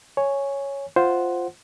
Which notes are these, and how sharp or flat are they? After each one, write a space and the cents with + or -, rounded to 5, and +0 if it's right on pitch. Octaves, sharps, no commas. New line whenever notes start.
C#5 +0 G#5 +0
F4 +0 C5 +0 F#5 +0